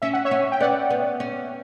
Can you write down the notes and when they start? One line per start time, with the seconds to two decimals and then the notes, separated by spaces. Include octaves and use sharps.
0.02 C#4 E5
0.13 F#5
0.25 C#5 E5
0.31 C#4
0.52 G5
0.60 B3 D5 F#5
0.90 B3
1.20 C#4